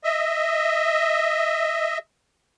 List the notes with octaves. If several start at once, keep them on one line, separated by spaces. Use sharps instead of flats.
D#5 E5